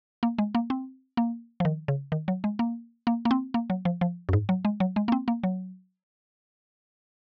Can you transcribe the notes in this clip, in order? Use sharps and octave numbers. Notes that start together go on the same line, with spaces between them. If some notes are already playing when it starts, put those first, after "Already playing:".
A#3
G#3
A#3
C4
A#3
F3
D#3
C#3
D#3
F#3
G#3
A#3
A#3
A#3
C4
A#3
F#3
F3
F3
F#2
G#2
F#3
G#3
F#3
G#3
A#3
C4
A#3
F#3